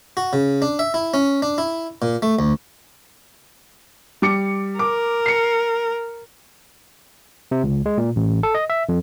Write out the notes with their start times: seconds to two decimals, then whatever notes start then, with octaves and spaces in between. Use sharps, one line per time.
0.17 F#4
0.33 C#3
0.62 D4
0.79 E5
0.94 E4
1.14 C#4
1.42 D4
1.58 E4
2.02 A#2
2.22 A3
2.39 D2
4.22 G3 D6 C#7
4.79 A#4 D6
5.26 C7 C#7
7.51 C3
7.63 C#2
7.86 G#3
7.98 A#2
8.16 A1
8.43 A4
8.55 D#5
8.70 E5
8.89 F2